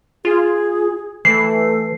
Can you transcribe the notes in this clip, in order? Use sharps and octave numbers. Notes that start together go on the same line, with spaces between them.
F4 G#4
E3 A3 C7